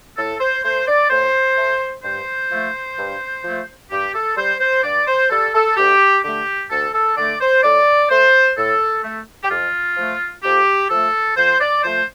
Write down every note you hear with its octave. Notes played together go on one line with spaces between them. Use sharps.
A2 A4
C5
A3 C5
D5
A2 C5
A3
G2 C5
F3 A3
G2
F3 A3
G2 G4
A4
G3 C5
C5
G2 D5
C5
G3 A4
A4
D2 G4
D3 A3 G4
D2 A4
A4
D3 A3 D5
C5
A2 D5
A3 C5
A2 A4
A3
G4
F2 F4
F3 A3
F2 G4
F3 A3 A4
F2 C5
D5
F3 A3 C5